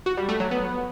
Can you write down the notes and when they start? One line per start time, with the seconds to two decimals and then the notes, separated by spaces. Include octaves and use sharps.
0.06 F#4
0.17 G3
0.29 A3
0.40 F#3
0.51 B3